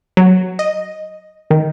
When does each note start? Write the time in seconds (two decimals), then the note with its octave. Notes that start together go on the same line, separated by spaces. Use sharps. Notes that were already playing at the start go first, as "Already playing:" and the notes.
0.17 F#3
0.59 D#5
1.51 D#3